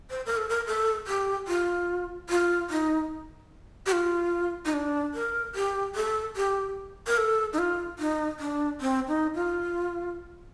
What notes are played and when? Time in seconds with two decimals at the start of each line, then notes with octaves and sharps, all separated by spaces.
0.10 C5
0.26 A#4
0.37 A4
0.49 A#4
0.67 A4
1.07 G4
1.48 F4
2.30 F4
2.70 D#4
3.86 G4
3.92 F4
4.65 D#4
4.73 D4
5.14 A#4
5.55 G4
5.95 A4
6.37 G4
7.07 A#4
7.18 A4
7.53 D#4
7.59 F4
7.99 D#4
8.40 D4
8.81 C4
9.08 D#4
9.35 F4